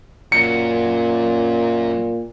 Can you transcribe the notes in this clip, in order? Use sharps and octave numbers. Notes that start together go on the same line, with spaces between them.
F#2 A#2 F#3 C#7